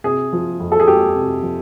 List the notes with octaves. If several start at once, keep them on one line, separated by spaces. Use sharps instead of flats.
C3 G#4
F3
F2
A4
G#4
G#3 G4
C3
F3